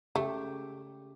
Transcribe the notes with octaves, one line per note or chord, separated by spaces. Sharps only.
C#3 A3 G4